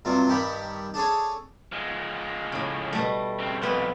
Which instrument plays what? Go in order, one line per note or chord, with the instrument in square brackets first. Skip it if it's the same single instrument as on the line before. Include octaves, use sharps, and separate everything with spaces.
[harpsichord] G2 C3 F#3 F4
G2 D#3 G3 G4 B5
D4 G#4 A4 C#5
[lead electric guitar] F3 G#3
[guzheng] A2 C#3
B2 G3 A3
[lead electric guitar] C#3 C4
[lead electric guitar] C2 F2 [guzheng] B3 F4 E5